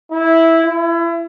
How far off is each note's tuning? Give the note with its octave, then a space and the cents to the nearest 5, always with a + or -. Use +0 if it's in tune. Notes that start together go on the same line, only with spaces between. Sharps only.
E4 -10
E4 +35